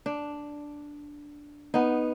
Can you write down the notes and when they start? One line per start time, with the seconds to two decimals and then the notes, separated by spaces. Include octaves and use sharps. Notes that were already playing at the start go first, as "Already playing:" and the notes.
0.06 D4
1.74 B3 D#4